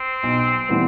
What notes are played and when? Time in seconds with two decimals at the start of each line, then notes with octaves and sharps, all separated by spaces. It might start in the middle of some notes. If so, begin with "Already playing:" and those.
Already playing: C4
0.23 B1
0.69 A2 E3 G3 B3